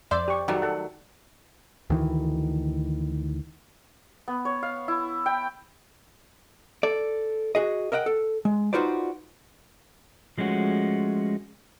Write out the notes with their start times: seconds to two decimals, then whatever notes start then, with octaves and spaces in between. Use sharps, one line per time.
0.11 F2 C5 D5 E5 E6
0.28 G4 C#6
0.48 D#3 F#3 G3 A3 F#5
0.62 A4 F#5
1.90 D2 D#3 E3
4.28 B3
4.45 C#5
4.63 F5
4.88 E4
5.26 G5
6.83 A4 D5
7.55 F#4 G#4 D#5
7.92 A#4 D#5 E5 F#5 G5
8.06 A4
8.45 G#3
8.73 D#4 F4 F#4 B4 C5 D5
10.38 F3 G#3 A3 C#4 F#4